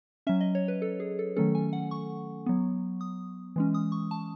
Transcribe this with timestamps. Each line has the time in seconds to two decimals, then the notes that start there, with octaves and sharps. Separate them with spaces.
0.27 F#3 C#4 E5
0.41 D#5
0.55 C#5
0.68 B4
0.82 A4
1.00 G#4
1.19 A4
1.36 D#3 F#3 A3 C#4 A4
1.55 G#5
1.73 F#5
1.91 C#6
2.46 F#3 B3
3.01 D#6
3.56 E3 G#3 C#4
3.74 D#6
3.92 C#6
4.11 A5